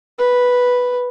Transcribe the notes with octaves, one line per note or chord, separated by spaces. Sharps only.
B4